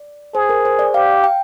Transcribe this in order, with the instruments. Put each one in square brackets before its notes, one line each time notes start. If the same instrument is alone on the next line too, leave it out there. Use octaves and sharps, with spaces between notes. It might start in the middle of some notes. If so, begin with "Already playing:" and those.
Already playing: [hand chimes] D5
[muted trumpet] G#4 [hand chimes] C5
[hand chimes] A#4
C5
D5
[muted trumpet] G4 [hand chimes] F5
[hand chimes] G5